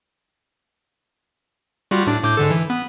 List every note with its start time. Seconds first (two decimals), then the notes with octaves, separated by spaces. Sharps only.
1.91 G3 F4 F#4
2.07 A2 D4
2.23 A2 D6 G6
2.37 G#2 D3 A4
2.51 E3
2.70 B3